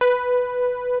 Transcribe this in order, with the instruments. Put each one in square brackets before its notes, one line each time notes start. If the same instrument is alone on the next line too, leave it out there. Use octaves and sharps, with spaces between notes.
[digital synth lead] B4